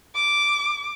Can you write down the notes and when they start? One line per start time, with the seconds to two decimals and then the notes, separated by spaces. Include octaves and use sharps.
0.15 D6